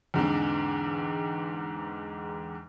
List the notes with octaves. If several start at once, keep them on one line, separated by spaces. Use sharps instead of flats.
E2 G#2 D3 C4